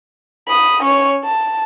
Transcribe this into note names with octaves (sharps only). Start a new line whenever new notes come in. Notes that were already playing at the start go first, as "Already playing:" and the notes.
B5 D#6
C#4 C#5
A5